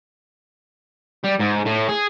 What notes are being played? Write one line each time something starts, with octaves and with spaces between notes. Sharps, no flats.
G3
G#2
A2
G#4